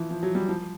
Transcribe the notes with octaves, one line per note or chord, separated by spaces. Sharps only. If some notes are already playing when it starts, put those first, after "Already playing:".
Already playing: E3 F3
F3
F#3
G3
F3